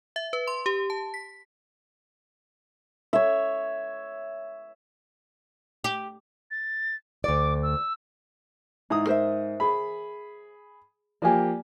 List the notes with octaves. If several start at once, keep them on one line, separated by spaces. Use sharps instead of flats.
E5
B4
C6
G4
A5
B6
C#5 E5
G4
A6
D2 D5 D6
E6
G#2 E4 A#5 D#6
A#4 C5 E5
G#4 B5
F3 A#3 G4 D5 G#5